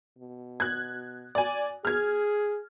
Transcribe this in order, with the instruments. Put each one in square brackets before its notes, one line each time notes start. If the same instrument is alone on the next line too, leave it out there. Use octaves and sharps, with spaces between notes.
[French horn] B2
[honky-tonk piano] F#6 G#6
D5 G#5
[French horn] G#4 [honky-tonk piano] F6 G#6